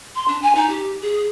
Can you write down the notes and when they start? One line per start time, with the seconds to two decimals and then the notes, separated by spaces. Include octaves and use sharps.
0.15 C6
0.28 D4
0.42 G#5
0.55 D#4
0.69 G4
1.02 G#4